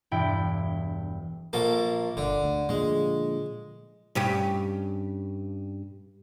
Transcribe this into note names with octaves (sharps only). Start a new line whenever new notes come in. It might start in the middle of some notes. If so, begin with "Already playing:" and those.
E1 G2 E4 G5
A#1 A#3 A4
G1 D3
D2
A#2 D3 F3 G#3
G2 C#4 G4